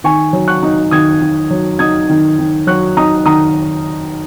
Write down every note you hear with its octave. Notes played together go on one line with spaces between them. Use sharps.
D#3 G#5 C#6
F#3
C#6 F#6
D#4
D#3 D#6 G#6
D#3
F#3
D#4 D#6 G#6
D#3
D#3
F#3 C#6 F#6
D#4 A#5 D#6
D#3 A#5 D#6